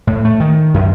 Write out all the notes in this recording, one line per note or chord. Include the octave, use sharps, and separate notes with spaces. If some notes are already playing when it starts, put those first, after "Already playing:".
A2
A3
D#3
F#2